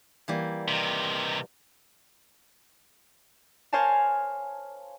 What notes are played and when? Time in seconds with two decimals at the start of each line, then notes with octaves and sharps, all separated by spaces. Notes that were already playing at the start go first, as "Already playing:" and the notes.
0.28 E3 G3 A#3
0.68 C3 D#3
3.73 A#4 C5 C#5 F5 G#5 A5